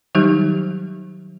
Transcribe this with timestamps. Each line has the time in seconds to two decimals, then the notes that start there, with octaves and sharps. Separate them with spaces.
0.15 D#3 F#3 G3 D#4 G4